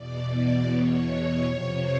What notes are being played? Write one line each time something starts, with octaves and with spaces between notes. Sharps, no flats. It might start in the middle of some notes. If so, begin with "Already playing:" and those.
Already playing: E2 B2 D5
D5
C#5
F2 C3 F3